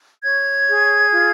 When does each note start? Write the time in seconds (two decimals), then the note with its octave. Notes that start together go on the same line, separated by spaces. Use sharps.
0.23 C#5 G#6
0.68 G#4
1.13 F4